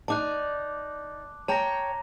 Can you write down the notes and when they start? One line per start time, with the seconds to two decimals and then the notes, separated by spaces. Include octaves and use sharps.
0.08 D#4 D5 A5 D6 F#6
1.48 C#5 G5 A5 A#5 A#6